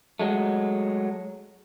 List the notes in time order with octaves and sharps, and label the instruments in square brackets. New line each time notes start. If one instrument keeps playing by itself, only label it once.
[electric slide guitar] F#3 G#3 A3